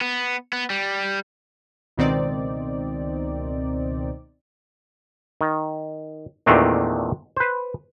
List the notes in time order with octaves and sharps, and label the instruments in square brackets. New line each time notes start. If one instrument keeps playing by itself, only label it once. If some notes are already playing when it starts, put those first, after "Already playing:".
[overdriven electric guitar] B3
B3
G3
[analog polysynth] C#2 B2 D#3 C4 D#4 D5
[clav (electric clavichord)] D#3
E2 A#2 D#3 A3 C4 D4
B4 C5